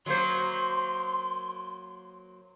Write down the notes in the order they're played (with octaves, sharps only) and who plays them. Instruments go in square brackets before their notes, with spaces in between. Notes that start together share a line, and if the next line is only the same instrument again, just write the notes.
[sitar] F#3 A#3 C5 [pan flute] C6